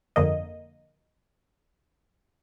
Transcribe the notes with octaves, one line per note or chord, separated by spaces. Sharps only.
G1 F2 D3 A#3 D#5